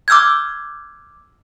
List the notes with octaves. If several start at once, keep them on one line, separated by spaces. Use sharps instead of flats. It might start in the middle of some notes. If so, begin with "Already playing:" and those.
D6 E6 F6 G6 G#6